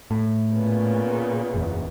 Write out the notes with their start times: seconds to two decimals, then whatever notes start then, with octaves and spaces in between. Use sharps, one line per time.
0.11 A2
0.54 A#2 C#3 B3
1.54 F#1 E2